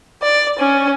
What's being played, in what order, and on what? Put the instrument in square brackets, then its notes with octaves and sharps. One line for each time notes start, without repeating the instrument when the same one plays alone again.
[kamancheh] D5
C#4